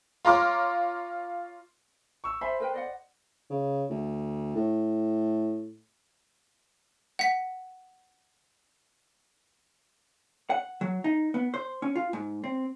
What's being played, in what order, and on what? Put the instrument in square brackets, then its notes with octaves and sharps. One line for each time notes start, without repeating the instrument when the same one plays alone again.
[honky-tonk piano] F4 C#5 A#5 C6 D6 F6
[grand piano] C#6 E6
[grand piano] C5 B5 C6 [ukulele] E5 G#5
[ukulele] A#4 B4 G5
D5 D#5 F#5
[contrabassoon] C#3
D2
A2
[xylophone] F#5 B6
[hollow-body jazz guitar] F#5
F#3
D#4
B3
C5
C#4
F4
G#2
C4